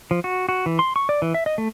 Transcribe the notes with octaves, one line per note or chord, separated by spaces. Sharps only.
F3
F#4
F#4
E3
C6
C#6
D5
E3
E5
D#5
A3